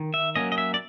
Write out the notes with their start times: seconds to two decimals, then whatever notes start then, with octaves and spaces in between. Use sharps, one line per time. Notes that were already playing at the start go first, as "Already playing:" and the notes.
Already playing: D#3
0.14 E5
0.36 F#3 A#3 C#4 D#5
0.52 D#5
0.58 E5
0.74 D5